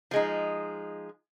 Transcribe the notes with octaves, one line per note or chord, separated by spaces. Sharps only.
F3 G#3 D#4